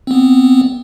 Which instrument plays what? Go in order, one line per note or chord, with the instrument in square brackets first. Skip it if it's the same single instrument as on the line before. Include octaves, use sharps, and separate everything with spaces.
[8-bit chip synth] B3 C4